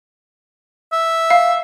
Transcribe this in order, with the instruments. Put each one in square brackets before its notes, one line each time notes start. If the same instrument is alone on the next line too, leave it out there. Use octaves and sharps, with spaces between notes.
[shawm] E5
[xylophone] F5